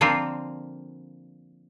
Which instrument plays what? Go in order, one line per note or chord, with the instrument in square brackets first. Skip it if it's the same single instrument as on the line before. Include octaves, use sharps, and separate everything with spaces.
[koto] D3 F3 A#3 C4 F4